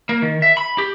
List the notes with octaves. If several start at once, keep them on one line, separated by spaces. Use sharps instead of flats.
A#3
D#3
E5
B5
G4